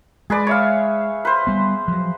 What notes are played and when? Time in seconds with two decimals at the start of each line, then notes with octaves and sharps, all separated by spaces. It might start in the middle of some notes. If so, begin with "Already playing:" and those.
0.30 G#3 G#4 B4 D5
0.47 C#5 E5 F5
1.25 B4 C5
1.47 G3 B3
1.88 F3 F#3